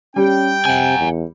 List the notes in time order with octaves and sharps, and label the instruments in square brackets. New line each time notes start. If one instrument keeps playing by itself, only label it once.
[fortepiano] G3 [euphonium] C#4 [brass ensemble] G5
[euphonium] C3 [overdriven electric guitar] F#5 G#5
[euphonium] E2